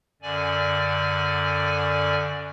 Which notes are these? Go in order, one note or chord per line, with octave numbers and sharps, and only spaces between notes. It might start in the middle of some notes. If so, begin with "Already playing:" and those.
F#2 D3 D5 G#5